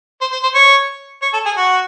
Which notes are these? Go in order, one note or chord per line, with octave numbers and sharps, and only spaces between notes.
C5
C5
C5
C#5
C#5
A4
G#4
F#4